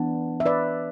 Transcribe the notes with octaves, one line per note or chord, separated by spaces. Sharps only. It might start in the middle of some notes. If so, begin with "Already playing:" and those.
Already playing: E3 B3 D4
E5
B4 D5